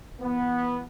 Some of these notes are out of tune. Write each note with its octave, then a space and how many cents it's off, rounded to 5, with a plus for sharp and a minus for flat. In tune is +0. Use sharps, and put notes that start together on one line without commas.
E3 +25 B3 -10